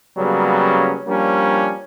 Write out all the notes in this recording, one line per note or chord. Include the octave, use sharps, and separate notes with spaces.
C#3 F#3 G3 A#3 B3 C#4
F3 G3 A#3 C#4 D4